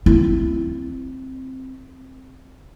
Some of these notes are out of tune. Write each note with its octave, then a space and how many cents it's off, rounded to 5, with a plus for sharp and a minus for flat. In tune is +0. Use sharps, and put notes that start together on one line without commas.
C4 +0 E4 +20